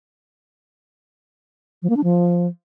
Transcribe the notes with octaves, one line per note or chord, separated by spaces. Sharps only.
F3
A#3
D4
F3